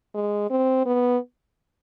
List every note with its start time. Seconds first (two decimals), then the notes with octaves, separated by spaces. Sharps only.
0.14 G#3
0.50 C4
0.86 B3